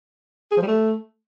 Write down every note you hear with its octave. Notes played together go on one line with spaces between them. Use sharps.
G#4
F3
G3
A3